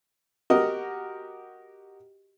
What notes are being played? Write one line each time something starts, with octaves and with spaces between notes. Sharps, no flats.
F#4 G4 A#4 D#5